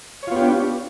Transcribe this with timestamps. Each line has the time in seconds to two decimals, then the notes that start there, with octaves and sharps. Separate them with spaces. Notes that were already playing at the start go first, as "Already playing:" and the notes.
0.23 C#5
0.27 F4
0.32 B3
0.36 G4
0.41 D4